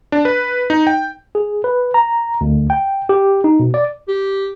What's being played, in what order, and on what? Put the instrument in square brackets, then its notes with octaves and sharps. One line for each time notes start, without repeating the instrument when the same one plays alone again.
[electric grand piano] D4
B4
D#4
G5
[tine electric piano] G#4
B4
A#5
D2
G5
G4
D#4
B2
D5
[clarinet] G4